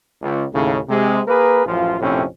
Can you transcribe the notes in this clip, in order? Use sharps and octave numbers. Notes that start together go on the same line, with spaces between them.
C#2
D#2 A2 C#3
C3 G#3
A#3 G#4 A#4 B4
A1 F#2 F3 F4
A#1 F2 A2 C3 C4 C#4